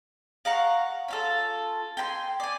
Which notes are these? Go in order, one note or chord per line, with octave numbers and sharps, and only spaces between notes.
F5 F#5 A#5 C#6
C#4 F4 A4
G5 G#5 B5 C6
D5 G#5